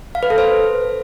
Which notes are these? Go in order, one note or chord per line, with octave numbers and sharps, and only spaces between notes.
F5
B4
A4
C5